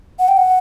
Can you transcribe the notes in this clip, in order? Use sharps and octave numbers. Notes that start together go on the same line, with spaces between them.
F#5
G5
F#5